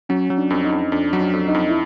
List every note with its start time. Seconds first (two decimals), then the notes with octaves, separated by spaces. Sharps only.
0.09 F#3 C#4
0.30 F#3
0.37 D4
0.50 F2
0.64 D#4
0.72 F2
0.92 F2 D4
1.13 F#3
1.20 D4
1.33 F2
1.48 D#4
1.55 F2
1.68 E4